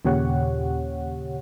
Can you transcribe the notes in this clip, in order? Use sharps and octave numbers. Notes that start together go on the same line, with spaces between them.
D#2 A#2 C#3 G4 C#5 F#5